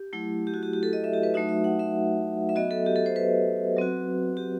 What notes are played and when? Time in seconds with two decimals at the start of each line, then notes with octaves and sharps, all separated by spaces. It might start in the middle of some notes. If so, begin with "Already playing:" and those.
Already playing: G4
0.13 F#3 A3 E4
0.47 G4
0.54 F#4
0.63 G4
0.73 G4
0.83 A4
0.93 D#5
1.04 E5
1.14 G4
1.23 B4
1.34 F#3 A3 D#4 F#4 E5
1.49 E5
1.64 F#5
1.79 E5
2.49 E5
2.56 F#3 B3 F#4 D#5
2.71 A4
2.86 G4
2.96 A4
3.06 C5
3.16 B4
3.77 F#3 C4 F#4
4.37 G4